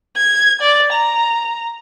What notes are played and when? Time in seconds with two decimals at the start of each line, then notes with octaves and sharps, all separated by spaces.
0.16 G#6
0.62 D5
0.93 A#5